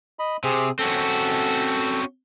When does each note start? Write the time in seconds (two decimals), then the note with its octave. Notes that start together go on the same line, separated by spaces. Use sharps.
0.19 D#5 B5
0.44 C3 C4 G#4
0.79 C4 C#4 F#4 A4